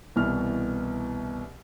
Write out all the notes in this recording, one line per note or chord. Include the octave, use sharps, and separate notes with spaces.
C2 B2 E3 F6